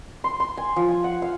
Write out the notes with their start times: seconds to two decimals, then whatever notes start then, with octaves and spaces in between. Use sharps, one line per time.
0.24 C6
0.40 C6
0.57 G#5
0.76 F3
0.89 G#5
1.04 F#5
1.22 F5